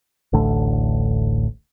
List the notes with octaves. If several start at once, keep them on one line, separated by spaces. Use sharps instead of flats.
D1 A1 D3 A3